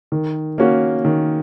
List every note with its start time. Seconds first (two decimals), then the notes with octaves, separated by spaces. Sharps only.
0.12 D#3
0.58 A#3 C#4 F#4
1.05 D#3